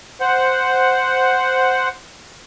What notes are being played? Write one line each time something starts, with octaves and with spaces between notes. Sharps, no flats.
C5 F#5